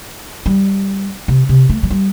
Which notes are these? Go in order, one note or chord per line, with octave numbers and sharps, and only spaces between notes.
G3
C3
C3
A3
F#3
G3